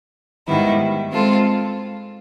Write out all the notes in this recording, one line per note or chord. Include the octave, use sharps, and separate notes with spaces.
G#2 D#3 G3 B3 E4
G#3 C4 F4 A4